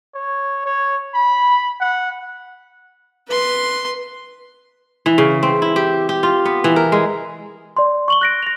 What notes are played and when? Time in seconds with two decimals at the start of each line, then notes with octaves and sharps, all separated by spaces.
0.15 C#5
0.66 C#5
1.14 B5
1.80 F#5
3.28 B4 C6
5.06 E3
5.18 C#3
5.43 C4
5.62 E4
5.76 G4
6.09 G4
6.23 F4
6.46 B3
6.64 E3
6.76 A#4
6.92 G#3
7.77 D5 C6
8.08 C#6 F#7 G7
8.21 F#6 A#6 D7
8.43 A#6 F7